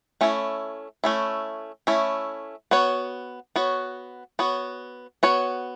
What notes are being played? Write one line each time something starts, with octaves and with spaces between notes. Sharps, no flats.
A3 C#4 E4
A3 C#4 E4
A3 C#4 E4
B3 F#4 C#5
B3 F#4 C#5
B3 F#4 C#5
B3 F#4 C#5